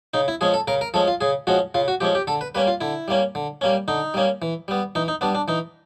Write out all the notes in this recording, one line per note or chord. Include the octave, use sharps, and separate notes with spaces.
C#3 D#4
E4
F3 G#3 C#4 G#4
A4
C#3 A#4
A#4
F3 G#3 C#4 A4
F4
C#3 G#4
F3 G#3 C#4 F#4
C#3 F4
F#4
F3 G#3 C#4 G4
G4
D3 A4
B4
G3 A#3 C#4 B4
F4
D3 E4
G3 A#3 C#4
D3
G3 A#3 C#4
D3 D#4
G3 A#3 C#4
E3
G3 B3
E3 D#4
D#4
G3 B3 D4
D4
E3 D#4